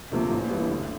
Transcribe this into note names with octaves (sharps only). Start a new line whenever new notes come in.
D2 C3 F3 A#3
A1
G2 E3 G3
D2